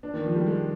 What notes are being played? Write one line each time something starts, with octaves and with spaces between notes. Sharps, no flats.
D4
D#3
F3
G3
G#3